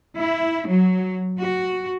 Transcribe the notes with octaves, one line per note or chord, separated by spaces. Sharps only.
E4
F#3
F#4